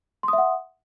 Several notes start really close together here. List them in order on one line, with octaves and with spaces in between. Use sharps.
C6 D#6 E5 F#5